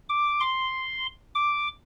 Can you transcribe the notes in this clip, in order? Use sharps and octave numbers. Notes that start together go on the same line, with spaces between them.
D6
C6
D6